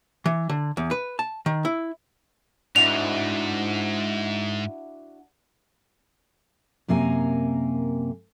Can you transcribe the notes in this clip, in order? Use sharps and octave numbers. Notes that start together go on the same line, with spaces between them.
E3
D3
E2
B4
A5
D#3
E4
G#2 D4 E4 F#4 F7
F#2 C3 A#3 A#4 G#5